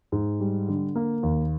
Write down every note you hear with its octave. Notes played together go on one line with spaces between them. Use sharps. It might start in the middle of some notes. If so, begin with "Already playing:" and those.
G#2
G3
D3
A#3
D#2